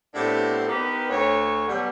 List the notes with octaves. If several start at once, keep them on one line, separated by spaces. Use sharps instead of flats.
A2 B3 C4 D4 G4
B3 D#4 G4 A#4 B4
D2 C#5
B2 F#3 G3